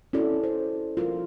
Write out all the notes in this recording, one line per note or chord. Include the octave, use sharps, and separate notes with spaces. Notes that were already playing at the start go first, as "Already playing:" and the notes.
C#4 E4 F#4 A4 D5
C5
F4 A#4